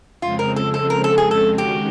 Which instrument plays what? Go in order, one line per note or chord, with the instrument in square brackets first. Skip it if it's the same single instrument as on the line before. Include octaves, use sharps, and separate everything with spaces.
[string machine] F2 C#3 F3 G#3 C4 [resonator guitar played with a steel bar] F4
[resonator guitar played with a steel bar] A#4
A4
A4
A#4
A4
G#4
A4
[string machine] D#3 G#3 C#4 F#4 [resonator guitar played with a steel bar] G4